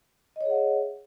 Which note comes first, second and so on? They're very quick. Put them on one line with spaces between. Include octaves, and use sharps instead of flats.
D#5 C#5 G#4 F#5 E5